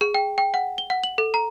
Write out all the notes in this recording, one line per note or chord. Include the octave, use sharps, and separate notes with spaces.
G#4
G5
G5
F#5
G7
F#5
F#7
A4
A#5